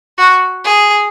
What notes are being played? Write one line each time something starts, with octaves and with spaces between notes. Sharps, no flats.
F#4
G#4